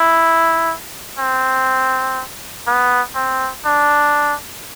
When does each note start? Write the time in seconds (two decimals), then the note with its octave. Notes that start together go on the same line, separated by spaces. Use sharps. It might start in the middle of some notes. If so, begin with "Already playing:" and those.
Already playing: E4
1.19 C4
2.67 B3
3.15 C4
3.66 D4